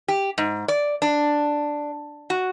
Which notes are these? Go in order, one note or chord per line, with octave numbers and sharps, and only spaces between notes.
G4
G#2
D5
D4
F#4